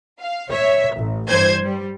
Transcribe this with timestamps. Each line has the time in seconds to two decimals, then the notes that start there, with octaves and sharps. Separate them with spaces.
0.19 F5
0.49 C#5 E5
0.95 A1
1.28 G2 E3 C5 G#6
1.63 G3